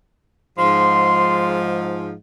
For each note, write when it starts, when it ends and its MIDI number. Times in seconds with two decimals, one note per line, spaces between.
0.58 2.14 44
0.58 2.14 53
0.58 1.62 84